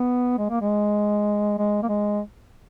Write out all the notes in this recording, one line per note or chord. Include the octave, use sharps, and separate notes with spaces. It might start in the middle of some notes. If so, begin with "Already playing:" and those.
Already playing: B3
G#3
A#3
G#3
G#3
A#3
G#3